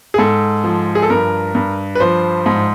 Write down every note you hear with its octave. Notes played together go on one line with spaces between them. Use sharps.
G#4
G#2 A4
F3
G#4
A4
G2 A#4
G2
B4
F3 C5
G#2